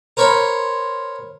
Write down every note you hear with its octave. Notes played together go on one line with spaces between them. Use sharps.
A#4 C5 C#5 B5